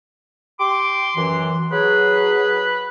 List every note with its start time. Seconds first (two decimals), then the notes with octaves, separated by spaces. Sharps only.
0.60 G4 C6 D6
1.16 F#2 E3
1.72 F#3 G#4 B4